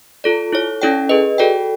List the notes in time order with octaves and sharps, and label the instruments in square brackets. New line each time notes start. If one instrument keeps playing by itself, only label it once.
[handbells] F4 A4 D5
E4 A4 C#5
C#4 E4 A4 D5 G5
G#4 B4 D#5
F#4 A4 D5 G5